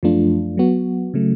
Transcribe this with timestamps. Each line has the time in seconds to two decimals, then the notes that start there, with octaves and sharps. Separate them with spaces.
0.03 F#2 F3 A3 D4 F4
0.57 F#3 B3 F#4
1.14 C#3 F#3 A3